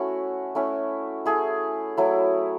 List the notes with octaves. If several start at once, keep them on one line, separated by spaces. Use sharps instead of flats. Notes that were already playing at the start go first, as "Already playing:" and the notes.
Already playing: A3 C#4 E4 F#4
A3 C#4 E4
A3 E4 G#4
F#3 A3 E4